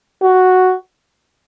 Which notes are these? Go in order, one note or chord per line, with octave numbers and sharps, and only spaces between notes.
F#4